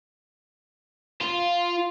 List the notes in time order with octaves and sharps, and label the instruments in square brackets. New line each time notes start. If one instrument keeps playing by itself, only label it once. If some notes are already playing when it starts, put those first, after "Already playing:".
[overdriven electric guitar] F4